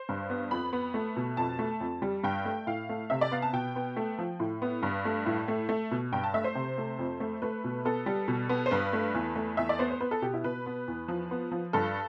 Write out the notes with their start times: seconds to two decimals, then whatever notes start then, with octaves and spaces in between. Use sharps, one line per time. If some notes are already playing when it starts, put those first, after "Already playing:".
Already playing: C5
0.09 G2
0.30 B3
0.51 F2 B5
0.73 B3
0.94 A3
1.16 B2
1.37 F2 A5
1.59 A3
1.80 F2
2.02 G3
2.24 G2 G5
2.45 A3
2.67 A2 F5
2.89 A3
3.10 C3 E5
3.21 D5
3.31 B3 F5
3.42 A5
3.53 B2 G5
3.76 B3
3.97 A3
4.19 F3
4.40 A2
4.62 B3
4.83 G2
5.05 A3
5.26 A2
5.48 A3
5.69 A3
5.91 B2
6.13 G2 G5
6.24 A5
6.34 A3 E5
6.44 C5
6.55 C3
6.78 A3
6.99 F2
7.20 A3
7.42 A3 B4
7.64 B2
7.85 B3 A4
8.06 G3
8.28 B2
8.49 B3
8.66 C5
8.71 G2 B4
8.93 A3
9.15 E2
9.36 A3
9.57 E2 E5
9.69 D5
9.79 B3 C5
9.91 C5
10.00 B3 B4
10.11 A4
10.22 B2 G4
10.34 E4
10.44 B2 B4
10.66 B3
10.88 E2
11.08 F3
11.31 B3
11.52 F3
11.73 G2 A4